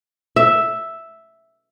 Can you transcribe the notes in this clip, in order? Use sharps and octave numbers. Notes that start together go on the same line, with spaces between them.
E5